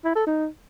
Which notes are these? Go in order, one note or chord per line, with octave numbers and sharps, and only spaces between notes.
E4
A4
D#4